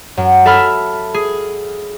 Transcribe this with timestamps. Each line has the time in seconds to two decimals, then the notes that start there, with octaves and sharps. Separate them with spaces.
0.17 F#2
0.46 A4 E5 B5 F6
1.14 G#4